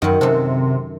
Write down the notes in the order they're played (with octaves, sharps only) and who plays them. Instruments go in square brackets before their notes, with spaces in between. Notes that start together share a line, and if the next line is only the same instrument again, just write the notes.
[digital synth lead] F#2 [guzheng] D#3 F#3
[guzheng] F#2 A4 [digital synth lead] C3